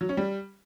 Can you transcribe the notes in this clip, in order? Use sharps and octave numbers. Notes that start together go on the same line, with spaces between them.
F#3
C#4
G3